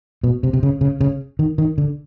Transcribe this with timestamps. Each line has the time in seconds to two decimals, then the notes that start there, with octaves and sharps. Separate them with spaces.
0.24 B2
0.43 C3
0.53 C3
0.63 C#3
0.81 C#3
1.01 C#3
1.39 D#3
1.58 D#3
1.78 D3